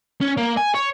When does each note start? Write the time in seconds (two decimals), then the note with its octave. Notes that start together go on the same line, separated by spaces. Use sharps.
0.21 C#4
0.37 A#3
0.57 G#5
0.75 C#5